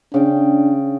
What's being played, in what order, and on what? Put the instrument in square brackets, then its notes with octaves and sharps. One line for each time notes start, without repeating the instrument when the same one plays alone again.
[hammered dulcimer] C#3 G5 [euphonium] D4